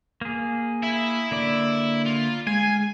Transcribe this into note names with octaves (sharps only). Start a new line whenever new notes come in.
A#3 G#4
E4 E5
D3 A#3 D5
F4
G#3 G#4 G#5